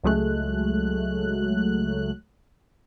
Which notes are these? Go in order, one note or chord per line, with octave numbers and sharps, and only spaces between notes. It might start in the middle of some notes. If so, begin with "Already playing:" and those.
C#2 F#3 G#3 A3 F#6